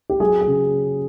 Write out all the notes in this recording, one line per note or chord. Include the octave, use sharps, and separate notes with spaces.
G4
F#3 G#4
G#4
C#3